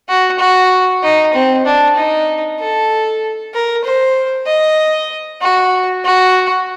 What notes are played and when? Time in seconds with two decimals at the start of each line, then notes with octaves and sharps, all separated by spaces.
0.09 F#4
0.39 F#4
1.03 D#4
1.34 C4
1.66 D4
1.96 D#4
2.59 A4
3.54 A#4
3.84 C5
4.47 D#5
5.41 F#4
6.05 F#4